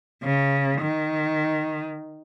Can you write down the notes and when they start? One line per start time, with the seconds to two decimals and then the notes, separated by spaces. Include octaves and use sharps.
0.23 C#3
0.81 D#3